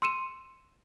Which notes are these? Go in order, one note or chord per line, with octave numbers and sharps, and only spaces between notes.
C6 E6 C#7 D#7 E7